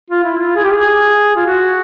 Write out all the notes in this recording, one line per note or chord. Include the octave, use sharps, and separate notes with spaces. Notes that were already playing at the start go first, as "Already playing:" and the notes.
F4
E4
F4
G#4
G4
G#4
F4
F#4